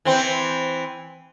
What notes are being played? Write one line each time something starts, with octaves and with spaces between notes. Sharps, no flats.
E3 C4